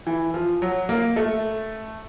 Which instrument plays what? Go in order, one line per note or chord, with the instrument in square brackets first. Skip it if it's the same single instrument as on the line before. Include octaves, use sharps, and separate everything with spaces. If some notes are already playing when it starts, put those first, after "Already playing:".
[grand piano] E3
F3
F#3
A#3
A3